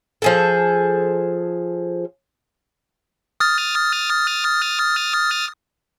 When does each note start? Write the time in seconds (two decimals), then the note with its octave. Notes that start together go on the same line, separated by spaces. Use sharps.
0.22 F3 G#4 A4
3.40 D#6 F6 A6